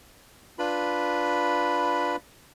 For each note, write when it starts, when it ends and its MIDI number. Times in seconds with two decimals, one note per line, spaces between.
0.59 2.16 62
0.59 2.16 65
0.59 2.16 71
0.59 2.16 83